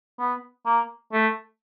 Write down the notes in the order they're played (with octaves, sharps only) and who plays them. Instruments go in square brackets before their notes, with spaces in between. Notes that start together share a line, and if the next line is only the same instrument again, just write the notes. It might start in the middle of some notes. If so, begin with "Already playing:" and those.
[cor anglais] B3
A#3
A3